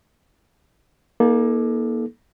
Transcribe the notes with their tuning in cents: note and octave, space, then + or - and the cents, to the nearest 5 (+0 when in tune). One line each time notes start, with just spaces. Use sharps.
A#3 +25 D#4 +25 A4 -30